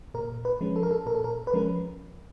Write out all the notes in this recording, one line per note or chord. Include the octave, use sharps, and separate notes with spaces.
A#2 A#4
B4
F3 G#3 C#4
A4
A#4
A4
A#2 A#4
A4
A#4
B4
F3 G#3 C#4 A#4